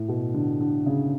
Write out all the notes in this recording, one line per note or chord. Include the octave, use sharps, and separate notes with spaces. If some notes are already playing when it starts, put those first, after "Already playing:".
Already playing: A2
B2
D3
D3
C#3